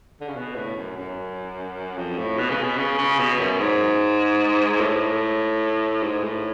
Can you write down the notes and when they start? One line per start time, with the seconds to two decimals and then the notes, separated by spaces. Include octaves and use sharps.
0.21 D3
0.28 C#3
0.36 B2
0.55 A2
0.76 F#2
0.96 F#2
1.97 F2
2.18 A2
2.38 B2
2.50 C#3
2.63 B2
2.78 C#3
2.98 C#3
3.19 B2
3.39 F#2
3.59 G#2
4.80 A2
5.01 A2
6.03 G#2
6.23 A2